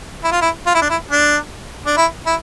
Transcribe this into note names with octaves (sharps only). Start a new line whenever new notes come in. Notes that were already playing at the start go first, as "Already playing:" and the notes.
E4
F4
E4
F4
E4
D4
E4
D4
D4
E4
E4